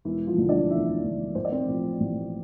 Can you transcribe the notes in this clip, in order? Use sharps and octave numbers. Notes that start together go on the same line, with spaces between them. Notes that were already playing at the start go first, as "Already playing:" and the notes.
E1 E3 E4
F3 F4
D2 D3 F3
D4 D5
E1 E4 E5
D2 D3 F3
A1 C5
D5
C4 C5
A2 F3
A1